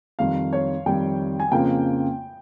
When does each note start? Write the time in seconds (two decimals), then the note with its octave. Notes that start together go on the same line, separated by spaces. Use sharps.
0.19 F2 D#3 G3 F5
0.53 C#5
0.86 F2 D#3 G3 G5
1.40 G#5
1.52 F2 C#3 F3 A#3 F4 G5